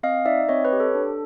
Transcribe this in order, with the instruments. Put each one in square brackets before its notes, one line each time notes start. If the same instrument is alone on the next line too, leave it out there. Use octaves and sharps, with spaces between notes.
[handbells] C4 D#5 F5
D#4 D5 E5
C4 C#5 D#5
B4 C#5
G4
A4
D4